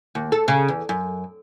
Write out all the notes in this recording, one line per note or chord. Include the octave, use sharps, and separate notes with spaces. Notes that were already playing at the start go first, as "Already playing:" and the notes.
D#2
A4
C#3
E2
F#2